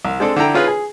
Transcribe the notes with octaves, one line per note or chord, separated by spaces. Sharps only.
C2
G#3 C4 D4 A4
D3 E4 G5 A#5
C#4 F4 G#4 B4
G#4